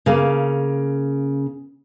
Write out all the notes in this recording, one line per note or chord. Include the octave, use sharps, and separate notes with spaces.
C#3 A#3